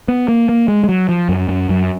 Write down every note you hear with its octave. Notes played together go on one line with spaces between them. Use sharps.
B3
A#3
A#3
G#3
G#3
F#3
F3
F#2
F#2
F#2